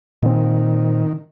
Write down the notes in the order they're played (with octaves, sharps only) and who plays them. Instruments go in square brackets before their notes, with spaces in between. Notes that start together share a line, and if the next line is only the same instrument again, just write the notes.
[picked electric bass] A#2 C4 [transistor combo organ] D#3